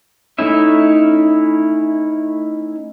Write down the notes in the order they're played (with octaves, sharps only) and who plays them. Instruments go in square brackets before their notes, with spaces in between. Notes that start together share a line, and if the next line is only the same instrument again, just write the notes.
[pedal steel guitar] A3 C#4 D#4 E4 E5